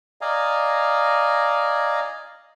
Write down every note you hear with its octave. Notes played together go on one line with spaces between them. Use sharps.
D5 D#5 F5 G#5 A#5